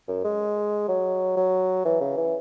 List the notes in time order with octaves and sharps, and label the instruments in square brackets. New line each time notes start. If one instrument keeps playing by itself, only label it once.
[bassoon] F#2
G#3
F#3
F#3
E3
C#3
E3